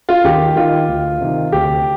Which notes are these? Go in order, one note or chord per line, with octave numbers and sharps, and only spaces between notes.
F4
D#2 G4
D#3 F4
D2
C3 D#3
D2 G4